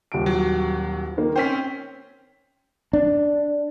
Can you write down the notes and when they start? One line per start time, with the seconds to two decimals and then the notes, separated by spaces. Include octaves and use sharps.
0.12 D#1 D7
0.26 F#3
1.18 D#3 A#3
1.36 C4 C#4 C5 G5 B6
2.93 D4